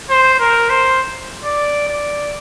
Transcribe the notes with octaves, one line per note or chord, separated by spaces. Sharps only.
C5
A#4
C5
D5
D5